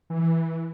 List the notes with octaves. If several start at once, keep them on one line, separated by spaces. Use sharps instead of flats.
E3